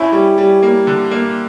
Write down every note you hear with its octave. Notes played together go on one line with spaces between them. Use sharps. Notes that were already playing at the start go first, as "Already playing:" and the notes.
Already playing: C#4 E4
G3
G3
A#3
D3
A#3